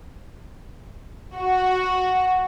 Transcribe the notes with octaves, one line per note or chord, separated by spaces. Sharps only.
F#4